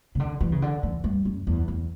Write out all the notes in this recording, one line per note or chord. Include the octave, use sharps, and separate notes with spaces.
C#3
D3
E3
C#3
D3
E3
G2
F#2
E2
E2